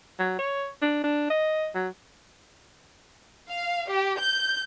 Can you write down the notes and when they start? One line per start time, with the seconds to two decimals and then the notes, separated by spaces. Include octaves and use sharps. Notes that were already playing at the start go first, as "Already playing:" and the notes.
0.19 F#3
0.39 C#5
0.82 D4
1.04 D4
1.30 D#5
1.75 F#3
3.50 F5
3.90 G4
4.20 G6